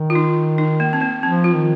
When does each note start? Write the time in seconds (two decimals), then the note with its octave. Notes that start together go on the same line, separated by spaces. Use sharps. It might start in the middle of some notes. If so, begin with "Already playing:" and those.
Already playing: D#3
0.10 F4
0.15 D#4
0.58 D#4
0.80 A#3
0.93 C4
1.02 A#3
1.23 F3 C4
1.44 F4
1.55 D#3